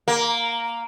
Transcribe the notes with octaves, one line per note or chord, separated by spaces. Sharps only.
A#3